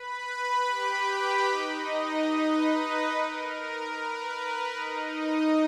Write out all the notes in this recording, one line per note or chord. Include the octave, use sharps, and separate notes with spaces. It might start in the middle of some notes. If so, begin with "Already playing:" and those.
Already playing: B4 B5
G4 G5
D#4 D#5
B4
A#4
B4
D#4 D#5